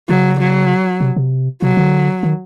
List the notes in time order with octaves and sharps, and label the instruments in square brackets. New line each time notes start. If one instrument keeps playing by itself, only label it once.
[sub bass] C#3 [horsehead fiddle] F#3
[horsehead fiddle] F#3
[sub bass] C3
C3
[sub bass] C3 [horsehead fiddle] F#3
[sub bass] D3
D#3